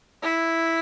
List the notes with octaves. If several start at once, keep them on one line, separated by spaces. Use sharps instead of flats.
E4